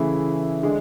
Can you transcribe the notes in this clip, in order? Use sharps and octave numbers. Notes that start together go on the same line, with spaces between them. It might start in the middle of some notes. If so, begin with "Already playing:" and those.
Already playing: C#3 E3 A3 E4 G#4
D3 G#3 D4 G#4